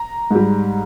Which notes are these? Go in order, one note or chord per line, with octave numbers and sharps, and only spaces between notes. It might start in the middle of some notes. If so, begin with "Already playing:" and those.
Already playing: A#5
G#2 G3